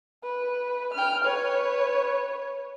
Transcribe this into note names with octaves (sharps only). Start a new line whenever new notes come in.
B4
G5 F6
B4 C#5